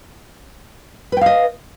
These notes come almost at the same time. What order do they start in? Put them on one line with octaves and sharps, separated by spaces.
B4 G5 F5 D#5